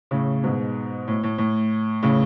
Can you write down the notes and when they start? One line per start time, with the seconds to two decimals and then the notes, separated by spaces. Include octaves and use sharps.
0.11 A2 C#3
0.44 G#2 B2
1.08 A2
1.23 A2
1.38 A2
2.03 A2 C#3